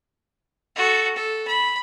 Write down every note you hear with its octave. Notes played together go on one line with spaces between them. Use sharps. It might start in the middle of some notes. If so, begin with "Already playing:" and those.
F#4 A4
A4
B5